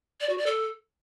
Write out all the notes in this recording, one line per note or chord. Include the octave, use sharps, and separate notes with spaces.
D5
F#4
D5
A4